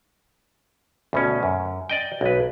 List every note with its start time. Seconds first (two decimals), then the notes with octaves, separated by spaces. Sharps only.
1.13 D2 B2 C#4
1.43 F#2
1.90 D5 D#5 G5
2.21 B1 B4